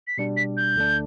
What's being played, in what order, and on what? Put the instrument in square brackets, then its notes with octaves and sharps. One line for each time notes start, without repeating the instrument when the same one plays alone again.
[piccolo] B6
[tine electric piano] B2 G3 D4 [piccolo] C#7
[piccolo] B6
G6
[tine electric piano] D2 D3 A3 D4